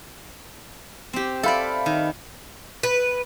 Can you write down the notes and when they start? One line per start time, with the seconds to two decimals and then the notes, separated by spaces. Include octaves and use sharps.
1.13 C4 G4
1.43 A4 C5 D5 E5 F5 B5
1.86 D#3
2.83 B4